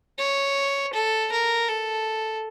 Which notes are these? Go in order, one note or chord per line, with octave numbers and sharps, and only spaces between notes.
C#5
A4
A#4
A4